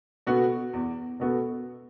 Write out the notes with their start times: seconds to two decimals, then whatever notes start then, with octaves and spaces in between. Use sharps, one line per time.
0.27 B2 B3 F#4 A4
0.73 E2
1.20 B2 B3 F#4 A4